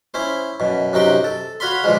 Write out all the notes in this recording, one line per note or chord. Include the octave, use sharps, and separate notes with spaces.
C#4 E4 C5
F#2 B2
F#2 C3 D#4 F#4 G5
A4
F#4 C#5 F5 B5 C6
B2 D3 F3 G#3